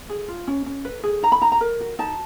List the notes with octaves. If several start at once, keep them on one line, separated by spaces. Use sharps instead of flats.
G#4
F4
C#4
C#4
B4
G#4
D#4 A#5
B5
D#4 A#5
A#5
A#4
F#4
D#4 A5